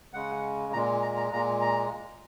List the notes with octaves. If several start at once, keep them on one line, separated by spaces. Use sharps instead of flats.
C#3 G#3 F#5
A#2 G#3 A#5
A#5
A#5
A#2 G#3 A#5
A#5